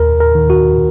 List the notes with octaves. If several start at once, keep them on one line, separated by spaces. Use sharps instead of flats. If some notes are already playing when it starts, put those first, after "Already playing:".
Already playing: D#2 A#4
A#4
D#3
F#4